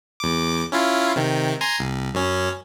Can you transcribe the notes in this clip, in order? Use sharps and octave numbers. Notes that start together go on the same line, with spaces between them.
E2 D6
C#4 E4 F4
C3 D#3
G#5 A#5 C6
C2
F#2 C#4